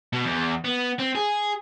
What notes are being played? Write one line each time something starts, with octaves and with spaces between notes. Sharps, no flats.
B2
E2
B3
C4
G#4